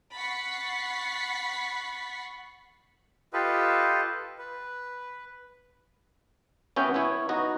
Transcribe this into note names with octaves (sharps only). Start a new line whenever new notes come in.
F#5 B5 C#6 A6 B6 C7
F4 G4 A4 B4 D#5
B4
B3 C#4 F#4 C#5 E5 G5
B3 E4 C#5
B3 D#4 F#4 D#5